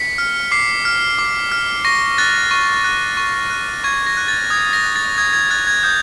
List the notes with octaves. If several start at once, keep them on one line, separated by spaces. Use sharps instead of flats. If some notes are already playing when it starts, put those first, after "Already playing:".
Already playing: B6 C#7
F6
D6 C7
F6
D6
F6
C#6 A#6
F#6 A6
C#6
F#6
C#6
F#6
C#6 G#6
A#6
F#6
A6
D#6 G#6
A#6
F#6
A6
D#6 G#6
G#6
F#6 A6
G#6
D#6 G6